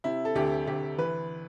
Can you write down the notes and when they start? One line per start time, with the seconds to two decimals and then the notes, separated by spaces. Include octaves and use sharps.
0.04 C3 E4
0.25 A4
0.35 D2 G4
0.67 D2 G4
0.98 E3 B4